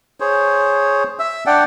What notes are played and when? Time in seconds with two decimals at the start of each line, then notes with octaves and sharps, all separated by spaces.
0.20 G#4 C5 C#5
1.19 E5 E6
1.46 D4 D5 F#5 G5